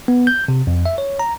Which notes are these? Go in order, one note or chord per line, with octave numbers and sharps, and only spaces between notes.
B3
G6
C3
F2
E5
C#5
A#5